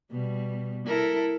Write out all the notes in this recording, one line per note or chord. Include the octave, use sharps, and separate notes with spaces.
B2 G3
E4 A4 A#4